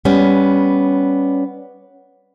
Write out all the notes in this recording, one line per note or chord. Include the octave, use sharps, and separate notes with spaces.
G3 B3 C#4